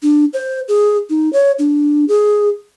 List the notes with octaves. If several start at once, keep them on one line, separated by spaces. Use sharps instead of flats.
D4
C5
G#4
D#4
C#5
D4
G#4